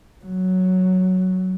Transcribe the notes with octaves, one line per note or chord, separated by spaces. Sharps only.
F#3